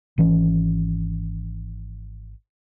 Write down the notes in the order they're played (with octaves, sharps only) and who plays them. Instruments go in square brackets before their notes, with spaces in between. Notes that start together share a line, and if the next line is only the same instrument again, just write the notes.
[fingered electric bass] G#1 E3 C#4